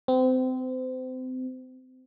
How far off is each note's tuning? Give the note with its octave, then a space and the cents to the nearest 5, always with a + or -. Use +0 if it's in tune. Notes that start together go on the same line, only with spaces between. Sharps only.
C4 -30